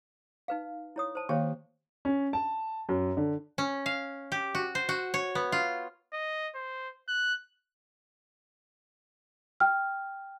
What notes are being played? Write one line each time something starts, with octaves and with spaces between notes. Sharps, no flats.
D#4 B4 F5
E4 C#5 D#6
C5 A5
D#3 A#3 G4 C5 C#5 F5
C#4
A5
F#2
D3
C#4
F5
G4
F#4
C5
F#4
C#5
B3
F4
D#5
C5
F#6
G5 F6